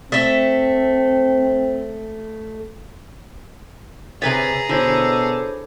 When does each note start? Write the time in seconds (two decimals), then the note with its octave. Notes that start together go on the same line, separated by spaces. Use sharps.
0.12 A3 C4 E5
4.22 C3 G#4 B4 C#5 A#5 A6 B6
4.69 B2 D3 E4 A4 C5 C#5